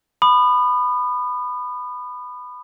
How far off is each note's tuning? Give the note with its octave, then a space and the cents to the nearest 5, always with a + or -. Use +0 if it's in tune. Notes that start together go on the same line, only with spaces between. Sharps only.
B5 +10 D#6 -35